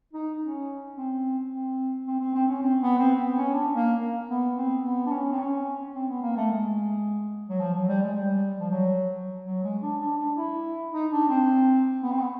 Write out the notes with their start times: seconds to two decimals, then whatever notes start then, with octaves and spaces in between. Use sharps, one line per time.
0.13 D#4
0.41 C#4
0.96 C4
1.52 C4
2.07 C4
2.20 C4
2.35 C4
2.48 C#4
2.62 C4
2.81 B3
2.99 C4
3.18 B3
3.36 C#4
3.54 D4
3.73 A#3
4.01 A#3
4.29 B3
4.56 C4
4.83 B3
5.06 D4
5.11 C#4
5.32 C4
5.38 C#4
5.95 C4
6.08 B3
6.22 A#3
6.37 A3
6.50 G#3
7.49 F#3
7.60 F3
7.74 F#3
7.89 G3
8.03 G#3
8.16 G3
8.60 F3
8.71 F#3
9.46 F#3
9.64 G#3
9.82 D4
10.01 D4
10.18 D4
10.37 E4
10.93 D#4
11.11 D4
11.29 C4
12.03 B3
12.12 C4
12.19 B3